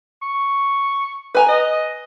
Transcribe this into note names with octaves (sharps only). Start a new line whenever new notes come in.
C#6
B4 G#5 A#5
D#5